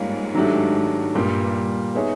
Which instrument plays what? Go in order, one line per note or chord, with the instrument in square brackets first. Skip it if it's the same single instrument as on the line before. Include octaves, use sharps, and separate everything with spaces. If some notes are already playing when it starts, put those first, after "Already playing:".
Already playing: [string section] G#2 [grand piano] G3 A#3 C#4 F4
[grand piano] D#3 F#3 A3 D4 G4
[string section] G2 [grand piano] A#2 G3 A#3
[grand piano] B3 D#4 G#4 C#5 E5